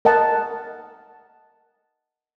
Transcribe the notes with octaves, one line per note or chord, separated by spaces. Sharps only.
A#4 D#5 F#5 A5